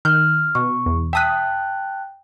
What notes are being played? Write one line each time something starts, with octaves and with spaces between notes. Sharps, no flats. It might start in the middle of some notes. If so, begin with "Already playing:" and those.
D#3 F6 G6
B2 C#6
E2
E5 G5 A5 D#6 F#6 B6